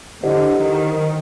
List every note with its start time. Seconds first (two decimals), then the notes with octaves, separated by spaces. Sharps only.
0.23 D3 E4 G4 C5 D#5 F#5
0.61 D#3